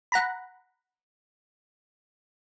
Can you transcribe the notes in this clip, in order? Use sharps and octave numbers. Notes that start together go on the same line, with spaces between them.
F#5 A#5 B5